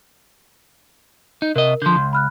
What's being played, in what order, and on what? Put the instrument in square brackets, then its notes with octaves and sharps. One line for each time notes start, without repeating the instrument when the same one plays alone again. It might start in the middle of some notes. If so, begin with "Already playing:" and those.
[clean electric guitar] D#4
[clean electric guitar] C3 D#5 [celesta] A#4
[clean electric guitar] D3 F3 [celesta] C6 G6
[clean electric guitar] C#2
[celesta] B5 F6 F#6